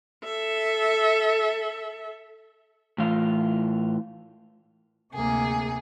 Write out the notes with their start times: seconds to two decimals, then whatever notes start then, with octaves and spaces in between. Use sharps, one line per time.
0.24 A4 E5
2.98 A2 E3 F4
5.14 D2 C3 A#3 G#4